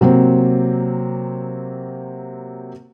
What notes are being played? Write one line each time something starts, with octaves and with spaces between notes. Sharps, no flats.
C3 F#3 A#3 C4